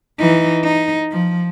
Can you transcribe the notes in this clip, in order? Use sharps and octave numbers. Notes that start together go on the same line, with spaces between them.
E3 D#4
D#4
F3